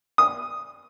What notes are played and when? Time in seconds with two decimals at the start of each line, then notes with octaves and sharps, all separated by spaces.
0.18 D#6